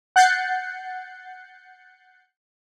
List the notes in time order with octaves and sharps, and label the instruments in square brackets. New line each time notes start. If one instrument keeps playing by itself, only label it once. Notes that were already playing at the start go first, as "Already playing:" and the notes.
[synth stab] F#5 F#6 G6 A6 C7 C#7